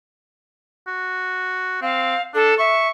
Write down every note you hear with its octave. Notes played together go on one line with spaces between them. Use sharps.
F#4
C4 F5
D4 A4
E5 C#6